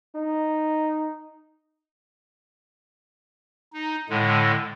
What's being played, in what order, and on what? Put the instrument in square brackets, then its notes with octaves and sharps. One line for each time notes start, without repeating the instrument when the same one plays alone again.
[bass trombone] D#4
[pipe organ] D#4
A2 D3 G#3